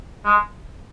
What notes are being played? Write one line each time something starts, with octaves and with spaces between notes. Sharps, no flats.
G#3